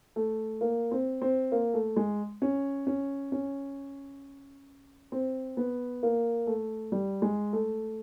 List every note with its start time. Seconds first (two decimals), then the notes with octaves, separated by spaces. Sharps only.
0.16 A3
0.61 A#3
0.91 C4
1.22 C4
1.52 A#3
1.74 A3
1.96 G#3
2.42 C#4
2.87 C#4
3.32 C#4
5.12 C4
5.57 B3
6.03 A#3
6.47 A3
6.92 G3
7.22 G#3
7.53 A3